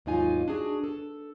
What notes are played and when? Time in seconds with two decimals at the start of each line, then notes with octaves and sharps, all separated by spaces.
0.06 D#2 G#2 F#3 D#4 F4 G#5
0.48 D4 F#4 G#4
0.84 A4